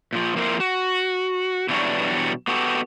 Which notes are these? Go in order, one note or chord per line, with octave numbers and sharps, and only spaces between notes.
A#2 F3
F3 A#3 C4 E4 A#4 C5
F#4
B2 E3 F#3 G3 D4 F#4
B3 F#4 G4 A4